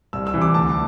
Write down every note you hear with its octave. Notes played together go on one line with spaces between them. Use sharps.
C2 E6
E6
C3 E3
D6
D2 A5